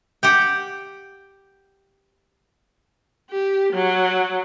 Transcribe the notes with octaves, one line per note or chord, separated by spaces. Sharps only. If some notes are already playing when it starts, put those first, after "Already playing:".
G4 F#5 G5
G4
F#3